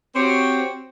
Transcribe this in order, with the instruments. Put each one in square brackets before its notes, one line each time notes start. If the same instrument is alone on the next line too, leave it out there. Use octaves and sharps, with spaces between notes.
[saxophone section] C4 F#4 G4 C5 C#5